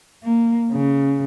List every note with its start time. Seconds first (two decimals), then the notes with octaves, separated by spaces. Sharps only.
0.23 A#3
0.72 C#3